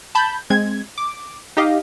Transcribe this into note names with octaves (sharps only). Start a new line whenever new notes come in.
A5 B5 G6
G#3 C4 G#6
D6
D#4 G4 D#5 F5